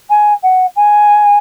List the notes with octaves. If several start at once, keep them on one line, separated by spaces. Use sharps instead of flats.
G#5
F#5
G#5